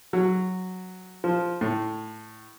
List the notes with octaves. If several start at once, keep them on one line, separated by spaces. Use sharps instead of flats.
F#3
F3
A2